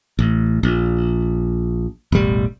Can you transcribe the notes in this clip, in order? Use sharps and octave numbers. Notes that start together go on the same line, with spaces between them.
A1
A#1
E1 A1 G3